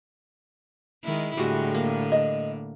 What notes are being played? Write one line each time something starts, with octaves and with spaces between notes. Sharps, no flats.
D#3 G#3 E4
A2 D3 G3 G#3 F#4
A#3
D#5